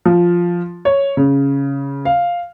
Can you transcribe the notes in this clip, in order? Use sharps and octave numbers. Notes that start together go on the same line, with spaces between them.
F3
C#5
C#3
F5